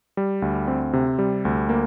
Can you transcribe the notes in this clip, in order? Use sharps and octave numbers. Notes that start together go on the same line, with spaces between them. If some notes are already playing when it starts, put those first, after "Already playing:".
G3
D2
C4
C3
G3
D2
A#3